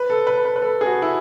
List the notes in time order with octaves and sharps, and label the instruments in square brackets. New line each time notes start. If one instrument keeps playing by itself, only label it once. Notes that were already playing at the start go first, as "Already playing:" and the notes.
Already playing: [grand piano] B4
A4
B4
B4
B4
A4
G#4
F#4
E4